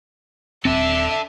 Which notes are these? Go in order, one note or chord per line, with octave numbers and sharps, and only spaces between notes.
D#1 C4 D4 A4 E5